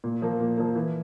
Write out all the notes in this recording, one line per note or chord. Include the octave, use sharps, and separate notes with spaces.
A#2
F3 A#3
A#2
F3 A#3
E3